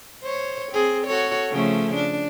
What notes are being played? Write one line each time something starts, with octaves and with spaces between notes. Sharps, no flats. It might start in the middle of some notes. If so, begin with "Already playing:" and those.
C5 C#5
C4 G#4
F#4 A4 C#5
C#3 F3 A3
D4